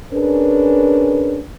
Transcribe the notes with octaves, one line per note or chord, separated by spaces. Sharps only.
C#4 D4 G#4 A#4 B4